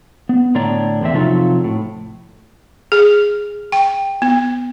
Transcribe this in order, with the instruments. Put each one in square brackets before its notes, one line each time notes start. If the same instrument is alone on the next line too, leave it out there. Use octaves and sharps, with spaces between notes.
[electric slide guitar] B3
A2 D3 D4 C#5 D5 A#5
E2 D3 C4 E5
C3 F3 F#3 D#4 F4 A4
A2
[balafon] G#4
G5
B3